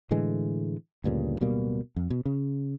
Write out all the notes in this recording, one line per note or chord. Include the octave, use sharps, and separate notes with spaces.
A2 D3 E3 G#3
D2 G2 A#2 C#3
D1 B2 G3 A#3
F2
B2
C#3